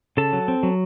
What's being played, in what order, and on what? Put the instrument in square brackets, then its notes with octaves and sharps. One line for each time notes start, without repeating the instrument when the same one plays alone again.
[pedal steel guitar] C#3 A4 A5
F#3
C4
F#3